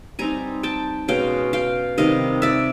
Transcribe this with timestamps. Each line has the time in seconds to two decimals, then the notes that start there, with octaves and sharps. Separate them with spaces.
0.19 G3 C4 D#4 G#5 A#5
0.63 G5 A5
1.08 B2 G#3 C#4 F5 G5
1.53 F5 G5
1.97 C3 D#3 G3 D#5 F5
2.42 D5 E5